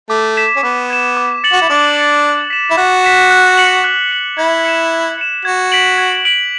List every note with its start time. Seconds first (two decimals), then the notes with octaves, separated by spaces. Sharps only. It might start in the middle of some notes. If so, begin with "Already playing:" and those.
0.09 A3 D6
0.36 G#6 B6 E7
0.56 C#4
0.63 B3 D6
0.90 G#6 B6 E7
1.17 D6
1.44 A6 C#7 F#7
1.52 F#4
1.62 E4
1.70 D4 D6
1.97 A6 C#7 F#7
2.24 F#6
2.50 B6 E7
2.70 E4
2.78 F#4 F#6
3.04 B6 E7
3.31 F#6
3.58 C#7 F#7
3.84 F#6
4.11 C#7 F#7
4.38 E4 G#6
4.65 C#7 E7
4.91 G#6
5.18 C#7 E7
5.45 F#4 G#6
5.72 B6 D7 F#7
5.98 G#6
6.25 B6 D7 F#7